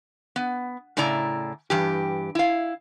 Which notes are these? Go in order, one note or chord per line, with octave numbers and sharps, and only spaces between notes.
B3
A2 C#3 E4 D5 A#5
G2 E3 G4
E4 F5